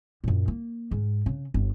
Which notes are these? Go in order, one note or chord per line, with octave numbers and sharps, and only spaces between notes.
F#2 A#2
A#3
G#2
C#3
G1